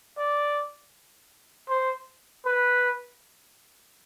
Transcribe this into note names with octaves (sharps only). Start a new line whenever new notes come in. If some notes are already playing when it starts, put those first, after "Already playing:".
D5
C5
B4